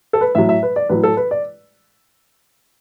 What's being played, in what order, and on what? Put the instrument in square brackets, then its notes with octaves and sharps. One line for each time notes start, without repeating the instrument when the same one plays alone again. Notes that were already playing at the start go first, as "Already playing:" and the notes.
[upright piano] A4
B4
A2 F#3 E5
E5
B4
D5
A2 F#3 B4
A4
B4
D5